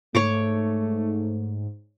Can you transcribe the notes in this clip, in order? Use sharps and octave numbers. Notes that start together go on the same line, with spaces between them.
G#2 A3 C#5 C#6 D6